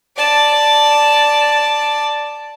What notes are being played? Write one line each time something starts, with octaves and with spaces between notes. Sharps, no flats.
D5 A5